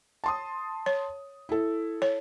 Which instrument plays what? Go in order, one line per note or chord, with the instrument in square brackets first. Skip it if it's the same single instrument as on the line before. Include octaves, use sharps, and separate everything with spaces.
[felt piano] A5 C6 D#6
[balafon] C#5
[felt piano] E4 A4
[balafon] C#5